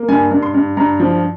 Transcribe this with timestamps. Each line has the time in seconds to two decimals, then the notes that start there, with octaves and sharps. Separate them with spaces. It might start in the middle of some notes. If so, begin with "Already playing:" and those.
Already playing: A#3
0.08 G2 G#5
0.31 G2
0.43 C6
0.54 G2
0.77 G2 A#5
1.00 F3